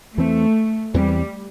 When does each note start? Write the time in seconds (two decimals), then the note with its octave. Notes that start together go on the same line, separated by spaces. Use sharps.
0.17 E2 E3 A3 C4
0.94 E2 E3 G3 C4